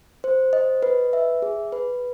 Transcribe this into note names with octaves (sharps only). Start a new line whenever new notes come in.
C5
D#5
B4
E5
G#4
B4